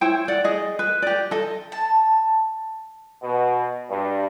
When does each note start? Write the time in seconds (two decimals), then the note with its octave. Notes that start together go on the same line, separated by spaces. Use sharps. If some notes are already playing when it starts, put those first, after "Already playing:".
0.01 E4 C5 C#5 G5
0.28 D5 F#5
0.44 G#4 D#5
0.79 B4
1.02 G4 D5
1.31 A4 D#5
1.72 A5
3.22 B2
3.90 G2